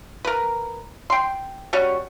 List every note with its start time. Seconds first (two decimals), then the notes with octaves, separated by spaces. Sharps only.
0.25 A#4 B4
1.10 G5 C6
1.73 G3 C#4 F#4